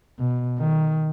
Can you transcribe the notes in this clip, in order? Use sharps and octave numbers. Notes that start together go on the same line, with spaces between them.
B2
D#3